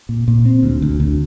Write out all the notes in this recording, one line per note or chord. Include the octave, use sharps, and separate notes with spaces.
A#2
A#2
C4
D2
D2
D2